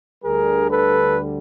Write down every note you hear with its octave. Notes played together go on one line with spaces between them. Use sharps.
D2 D3 G3 G#4 A#4
A4 B4